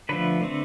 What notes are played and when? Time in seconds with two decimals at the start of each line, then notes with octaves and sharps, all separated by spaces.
0.09 D3 F3 A3 B4
0.41 D3 A3 C4